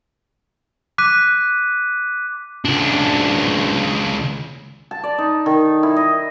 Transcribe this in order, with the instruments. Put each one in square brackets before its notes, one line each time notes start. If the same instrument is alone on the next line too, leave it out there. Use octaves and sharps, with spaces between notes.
[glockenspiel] D6 F#6 B6 D#7
[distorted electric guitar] C#2 D4
[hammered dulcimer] A5
D5
D#4
D#3
E4
D#5